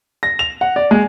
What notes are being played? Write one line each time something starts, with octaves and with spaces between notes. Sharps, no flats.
A#6
F7
F#5
D5
G#3